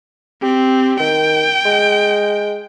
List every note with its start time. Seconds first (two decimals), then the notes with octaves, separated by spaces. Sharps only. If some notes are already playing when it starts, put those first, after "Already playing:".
0.42 C4 G4
1.00 D#3 G5
1.66 G#3